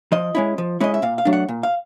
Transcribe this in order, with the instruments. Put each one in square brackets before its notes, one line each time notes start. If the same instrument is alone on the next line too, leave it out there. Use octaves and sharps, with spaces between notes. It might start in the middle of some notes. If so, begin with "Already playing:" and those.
[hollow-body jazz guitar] F3 D#5
G#3 C#4 E4
F3
G#3 C#4 E4 D#5
E5
A#2 F5
F5
F#3 A3 D4
F#5
A#2
F5